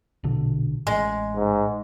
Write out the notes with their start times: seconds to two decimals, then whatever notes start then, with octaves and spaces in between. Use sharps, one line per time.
0.24 A#1 B2 D3
0.87 A1 G#3
1.36 G#2